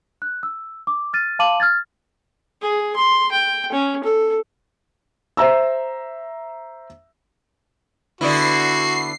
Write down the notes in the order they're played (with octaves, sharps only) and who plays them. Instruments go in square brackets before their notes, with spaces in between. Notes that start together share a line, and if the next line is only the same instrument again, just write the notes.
[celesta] F#6
E6
D6
F6 A6 D#7
F5 A5 C6 D6 D#7 F#7
F6 G#6 A6
[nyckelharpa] G#4
C6
G5
C#4
A4
[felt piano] C5 E5 A#5 E6
[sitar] D3 B3 E4 [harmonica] F#4 [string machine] C7